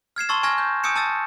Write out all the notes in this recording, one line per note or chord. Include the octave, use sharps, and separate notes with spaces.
F6 G#6 C7 E7
A5 C6 C#6 E6 A6
G#5 C#6 F6 G#6 A#6
G6
G#5 D#6 E6 G6 C#7 E7
A5 D#6 E6 A6